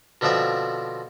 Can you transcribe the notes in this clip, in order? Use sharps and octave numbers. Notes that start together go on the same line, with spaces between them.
B2 D3 F3 C4 E5